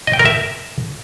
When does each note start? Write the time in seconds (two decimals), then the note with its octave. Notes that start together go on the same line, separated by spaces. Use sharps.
0.07 D#5
0.13 G5
0.19 A#4
0.25 E5